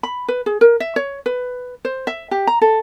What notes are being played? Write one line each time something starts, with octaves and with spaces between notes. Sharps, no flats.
B5
B4
G#4
A#4
E5
C#5
B4
C5
E5
G4
A#5
A4